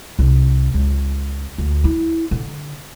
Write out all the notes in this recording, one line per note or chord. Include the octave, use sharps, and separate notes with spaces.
C2
C#2
D2
E4
D3